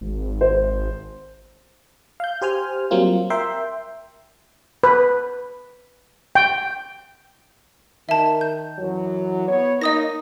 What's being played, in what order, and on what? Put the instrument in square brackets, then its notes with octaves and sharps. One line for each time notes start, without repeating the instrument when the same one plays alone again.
[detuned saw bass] G#1
[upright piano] C5
[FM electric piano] F5 G6
G4 C5 G#5 F6
F#3 G3 A#3 C4 F4
A#4 E5 G5 C6
[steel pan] B4
G5
[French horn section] D#3 [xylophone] E5 A5
[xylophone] G6
[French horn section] F#2 E3 F#3
B3 C#5
[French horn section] A#3 D#4 [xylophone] D#5 D#6 A#6